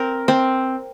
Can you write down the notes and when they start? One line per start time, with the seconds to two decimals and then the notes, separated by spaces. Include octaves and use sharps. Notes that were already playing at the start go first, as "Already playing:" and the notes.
Already playing: C4 A#4
0.28 C4